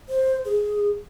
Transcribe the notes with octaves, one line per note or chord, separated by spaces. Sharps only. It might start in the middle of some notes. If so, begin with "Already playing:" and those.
C5
G#4